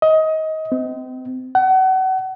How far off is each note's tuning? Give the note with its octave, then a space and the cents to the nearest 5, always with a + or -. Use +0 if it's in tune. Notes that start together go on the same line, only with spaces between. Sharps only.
D#5 +25
C4 -35
F#5 +30